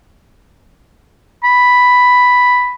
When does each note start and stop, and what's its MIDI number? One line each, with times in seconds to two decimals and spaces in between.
1.44 2.75 83